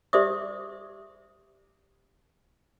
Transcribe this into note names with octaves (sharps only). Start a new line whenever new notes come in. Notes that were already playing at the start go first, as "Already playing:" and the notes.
G4 C5 D5 E5 D6 D#6